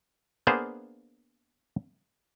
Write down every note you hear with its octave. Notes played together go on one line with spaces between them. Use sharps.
A#3 B3 D4 G#4 C5 F5